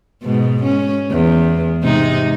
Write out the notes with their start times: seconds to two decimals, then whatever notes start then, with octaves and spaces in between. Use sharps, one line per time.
0.23 G#2 B2
0.63 C#4
1.10 E2
1.83 G#2 C3 D#4